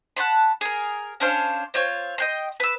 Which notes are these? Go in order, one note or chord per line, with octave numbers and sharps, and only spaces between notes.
F#5 A5 B5 C6
G#4 A#4
C#4 D4 C5 F5
C4 F4 C#5
D#5 G5 C6
B4 E6